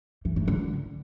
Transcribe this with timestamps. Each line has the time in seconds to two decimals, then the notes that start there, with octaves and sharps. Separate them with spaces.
0.25 E3
0.36 G#2
0.48 D3